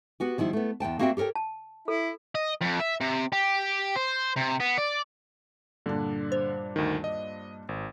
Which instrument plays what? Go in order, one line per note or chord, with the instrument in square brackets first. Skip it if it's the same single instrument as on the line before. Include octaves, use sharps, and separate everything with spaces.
[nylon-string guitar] B3 F#4 G4
D#3 F3 G3 E4
A3 B3
E2 G#2 G5 A5
A#3 C4 F#4 G4 E5 G5
G4 A4 A#4 C#5 G5
[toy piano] A5
[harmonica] E4 [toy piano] A4
[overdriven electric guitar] D#5
F2
E5
C3
G4
C5
C3
B3
D5
[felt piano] G2 A#2 D4 [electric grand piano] D3
[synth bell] C5
[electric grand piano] D2 D#3
D#5
G#1